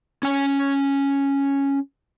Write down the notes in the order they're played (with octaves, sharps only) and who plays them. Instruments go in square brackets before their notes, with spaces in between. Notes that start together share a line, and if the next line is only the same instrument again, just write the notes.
[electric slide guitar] C#4 G#5